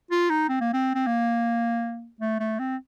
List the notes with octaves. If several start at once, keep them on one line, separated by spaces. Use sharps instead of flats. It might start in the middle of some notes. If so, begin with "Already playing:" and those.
F4
D#4
C4
A#3
C4
C4
A#3
A3
A3
C4